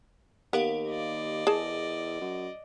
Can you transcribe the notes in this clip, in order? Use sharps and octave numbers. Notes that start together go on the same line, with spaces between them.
D#2 B3 G4 A#4 F5
D5 D#5
E2 G#4 A5
F#2